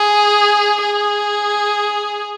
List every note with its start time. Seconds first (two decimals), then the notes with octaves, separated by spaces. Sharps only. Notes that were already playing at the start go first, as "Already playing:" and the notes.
Already playing: G#4
0.82 G#4